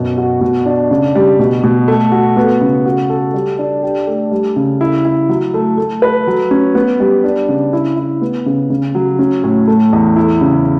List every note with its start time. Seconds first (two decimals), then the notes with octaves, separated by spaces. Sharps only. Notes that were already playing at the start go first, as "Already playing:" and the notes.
Already playing: F#2 B2
0.18 F#4
0.41 B2
0.66 D4
0.91 C#3
1.15 G3
1.39 B2
1.64 B2
1.88 A3
2.12 F#4
2.37 B3
2.61 C#3
2.86 F#4
3.10 A4
3.34 G3
3.59 D4
3.83 G4
4.07 A3
4.31 G3
4.56 C#3
4.81 E4
5.05 E4
5.29 F#3
5.54 A3
5.78 A3
6.02 B4
6.27 F#3
6.51 C#4
6.75 B3
7.00 G3
7.24 D4
7.49 C#3
7.73 E4
7.97 E4
8.22 B3
8.46 C#3
8.70 C#3
8.95 F#3
9.19 C#4
9.44 A2
9.68 A3
9.93 E2
10.16 E4
10.41 C#3